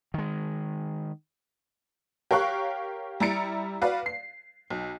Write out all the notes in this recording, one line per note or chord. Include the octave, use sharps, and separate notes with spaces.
D#3 G#3
G4 A#4 C#5 F5 C#6 F#6
G3 E4 A#5 A6 C#7 D7
F#4 B4 D5 F5
C7
B1